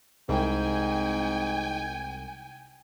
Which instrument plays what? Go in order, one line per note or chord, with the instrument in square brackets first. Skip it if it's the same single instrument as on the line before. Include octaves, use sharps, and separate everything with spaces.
[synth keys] C2 [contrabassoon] G#2 [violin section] G5 G#5